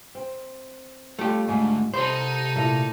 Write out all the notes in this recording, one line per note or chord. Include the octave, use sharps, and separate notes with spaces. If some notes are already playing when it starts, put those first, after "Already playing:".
C4
G3 A3 F4 G4
D2 G#2 A3
C3 D#4 A4 C5 B5
A#2 A3 E4